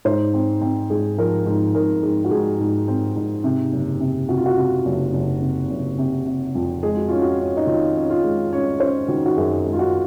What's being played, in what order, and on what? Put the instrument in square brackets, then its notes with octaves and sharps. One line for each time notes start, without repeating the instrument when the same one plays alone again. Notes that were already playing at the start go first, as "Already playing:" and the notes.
[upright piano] G#2 C5
C4
C4
G#2 G#4
F3 A#4
G#2
G#2 A#4
G#2 G#4
F#4
G#2 G#4
G#2
C4
G#2
C3
F#1
C3
C3 F#4
F4
F#4
C3
F#1
F#1
C3
F#1
C3
C3
F2
G#3 G#4
F#4
C#4 F4
F#4
C#4
D#4
D#3 F4
C#4
F4
G#3
C#4 C#5
C#4 C5
D#3 F#4
F#4
F#2 G#4
G#3
F4
F#4